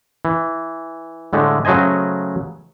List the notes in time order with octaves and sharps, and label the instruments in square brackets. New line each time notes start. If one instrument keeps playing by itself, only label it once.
[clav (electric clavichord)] E3
A2 D3 G#3 A3
C#3 F#3 A3 C5 D#5 G#5